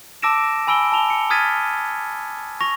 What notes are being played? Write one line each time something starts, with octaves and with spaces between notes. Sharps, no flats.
A5 D6 E6 A#6 D7 E7
G#5 B5 E6 D7 G7
A5 F7 G7
C#7
D#6 F6 G#6 A6 B6 D#7
C#6 A#6 F7